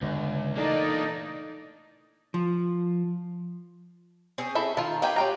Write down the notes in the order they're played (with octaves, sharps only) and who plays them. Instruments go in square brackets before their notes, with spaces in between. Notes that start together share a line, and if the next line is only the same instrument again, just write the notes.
[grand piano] G1 [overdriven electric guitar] C#2
[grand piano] E3 A3 A4 [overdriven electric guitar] A#3 D4 [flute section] D#4 D5
[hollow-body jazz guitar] F3
[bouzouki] C4 C#4 G#4
[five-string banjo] E4 A4 E5
[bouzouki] D#3 [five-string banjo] F4 A5
[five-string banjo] D#3 G5 G#5 [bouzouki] F4 G4 B4
[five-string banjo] C#4 G5 A#5